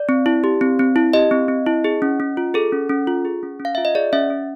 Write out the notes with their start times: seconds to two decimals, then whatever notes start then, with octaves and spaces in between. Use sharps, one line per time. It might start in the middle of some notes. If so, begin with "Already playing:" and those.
Already playing: D5
0.09 C4
0.26 E4
0.44 G4
0.61 C4
0.79 C4
0.96 E4
1.13 G4 D#5
1.31 C4
1.48 C4
1.66 E4
1.84 G#4
2.02 C#4
2.20 C#4
2.37 F4
2.54 G#4 A4
2.73 C#4
2.89 C#4
3.07 F4
3.25 G#4
3.43 C#4
3.60 C#4
3.65 F5
3.75 F4 E5
3.85 D#5
3.95 G#4 D5
4.12 C#4 E5
4.30 C#4